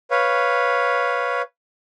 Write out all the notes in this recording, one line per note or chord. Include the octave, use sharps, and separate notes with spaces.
B4 C#5 F5